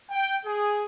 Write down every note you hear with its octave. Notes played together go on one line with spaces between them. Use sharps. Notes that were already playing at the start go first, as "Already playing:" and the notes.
G5
G#4